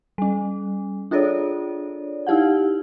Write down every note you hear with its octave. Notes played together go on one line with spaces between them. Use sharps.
G3 C#4
D4 F4 G#4 A4 C#5 D5
D#4 E4 G4 F5 F#5